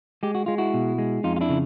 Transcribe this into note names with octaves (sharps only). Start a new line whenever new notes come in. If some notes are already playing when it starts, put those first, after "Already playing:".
G#3 G4
F#4
G#3 F4
E4 F#4
B2
G#3
F2 D#4 F4
F4
D4 E4
C#3